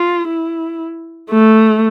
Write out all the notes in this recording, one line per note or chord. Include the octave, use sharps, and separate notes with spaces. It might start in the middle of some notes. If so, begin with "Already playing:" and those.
Already playing: F4
E4
A3